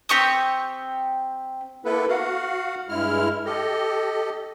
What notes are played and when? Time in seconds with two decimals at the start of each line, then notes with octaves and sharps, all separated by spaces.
0.09 C4 G4 C#6 D#6
1.85 A#3 B3 E4 A4 B4
2.09 F#4 F5 F#5
2.89 G2 G#3 E4 F6
3.45 G4 A4 D#5